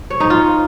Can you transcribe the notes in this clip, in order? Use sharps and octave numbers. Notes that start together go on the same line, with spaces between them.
C#5
D#4
F4